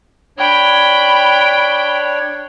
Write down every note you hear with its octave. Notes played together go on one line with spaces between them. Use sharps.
D4 C#5 G5 B5